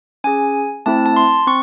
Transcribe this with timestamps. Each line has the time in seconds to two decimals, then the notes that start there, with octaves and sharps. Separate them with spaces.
0.24 C#4 G#4 G#5
0.86 A3 C4 E4 A4 A5
1.06 A5
1.16 C6
1.47 C4 C#6